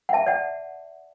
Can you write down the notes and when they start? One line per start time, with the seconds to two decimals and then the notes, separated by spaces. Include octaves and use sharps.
0.09 F#5
0.13 E5 A5
0.26 D5 F#5